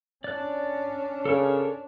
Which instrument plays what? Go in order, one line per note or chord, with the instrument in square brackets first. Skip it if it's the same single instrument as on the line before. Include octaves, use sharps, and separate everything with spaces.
[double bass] C#4 D4 [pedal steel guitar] D5 F#6
[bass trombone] C#3 [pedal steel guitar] A4 A#4 C#5